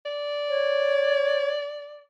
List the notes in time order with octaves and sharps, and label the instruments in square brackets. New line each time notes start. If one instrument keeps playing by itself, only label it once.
[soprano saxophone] D5
[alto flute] C#5